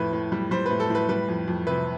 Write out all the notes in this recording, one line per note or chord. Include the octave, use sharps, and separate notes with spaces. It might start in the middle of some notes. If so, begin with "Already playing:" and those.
Already playing: F2 A2 B4
A2
G3
G3 C5
B4
A2
A4
A2 B4
G3 B4
F2
F2
C3 B4